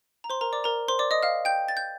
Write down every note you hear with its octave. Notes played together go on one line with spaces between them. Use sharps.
A#5
C5 C6
A#4 A#5
D5 D6
A#4 A#5
C5 C6
D5 D6
D#5 D#6
F5 F6
G5 G6
A6
G6